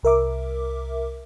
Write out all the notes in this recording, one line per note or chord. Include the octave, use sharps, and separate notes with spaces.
C2 A#4 E5 D6